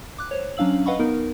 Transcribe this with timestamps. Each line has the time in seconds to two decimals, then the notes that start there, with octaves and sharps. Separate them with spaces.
0.18 D6 F#6
0.31 C5 C#5
0.57 F#3 C#4 D4 F5 E6 F#7
0.86 B4 D#5 F5 F#5 B5 C#6
0.99 B3 D#4 A#4